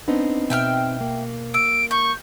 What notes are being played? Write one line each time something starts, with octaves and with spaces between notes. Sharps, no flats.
B3 C4 D4 D#4
B2 E5 G5 F6
A#3
E6 D7
C#6 G6